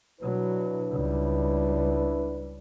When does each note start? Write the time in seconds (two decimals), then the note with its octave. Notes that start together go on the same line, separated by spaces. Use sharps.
0.21 B2 F#3 D4 E4 B4
0.92 C#2 G3